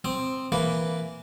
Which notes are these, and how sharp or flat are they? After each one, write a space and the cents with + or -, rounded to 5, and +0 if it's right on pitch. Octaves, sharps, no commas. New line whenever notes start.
C4 +0 D#6 -30
E3 +10 A#3 +0 B4 +0